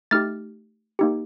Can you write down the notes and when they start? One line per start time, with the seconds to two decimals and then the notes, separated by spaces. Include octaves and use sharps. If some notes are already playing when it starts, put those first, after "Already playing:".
0.11 A3 D#4 G4 F6 A6
0.99 A#3 D#4 G4